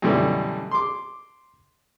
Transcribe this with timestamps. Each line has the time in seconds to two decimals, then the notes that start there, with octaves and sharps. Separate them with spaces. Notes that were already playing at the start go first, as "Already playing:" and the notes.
0.02 F#2 B2 D3 E3 G3 A3
0.71 C6 D6